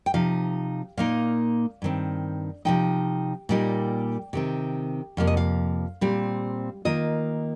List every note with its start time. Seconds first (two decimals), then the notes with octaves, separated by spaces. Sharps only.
0.06 G5
0.14 C3 F3 D#4 F5
0.97 A#2 A#3 D#4 F5
1.82 G2 D#3 C4
2.65 C3 F3 D#4 G5
3.49 A#2 G3 A#3 D#4
4.33 C3 D#3 C4
5.17 F2 C3 F3 A#3 F5
5.27 D#5
5.37 F5
6.01 A#2 G3 C4
6.85 D#3 A#3 F4 D#5